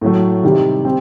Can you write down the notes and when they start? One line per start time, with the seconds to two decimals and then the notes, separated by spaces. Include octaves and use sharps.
0.01 A2 F#3 A3
0.43 C3 D#3 G3
0.85 G3 C4